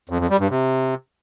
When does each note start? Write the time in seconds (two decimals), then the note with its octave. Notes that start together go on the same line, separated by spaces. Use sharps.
0.09 F2
0.20 F2
0.30 G3
0.40 G2
0.50 C3